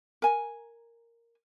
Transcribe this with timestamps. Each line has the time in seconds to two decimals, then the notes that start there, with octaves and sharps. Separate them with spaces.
0.22 A#4 G#5